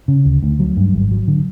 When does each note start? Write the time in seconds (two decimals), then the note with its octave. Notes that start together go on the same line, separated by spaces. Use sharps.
0.08 C#3
0.25 D2
0.43 D2
0.60 F#3
0.77 G2
0.94 G#1
1.11 F#3
1.28 D3